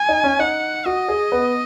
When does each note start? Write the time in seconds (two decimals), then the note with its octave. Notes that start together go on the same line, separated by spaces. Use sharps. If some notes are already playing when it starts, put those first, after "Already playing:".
Already playing: G#5
0.09 D#4
0.24 C#4
0.39 D#4 F#5
0.86 F#4 D#5
1.09 G#4
1.32 B3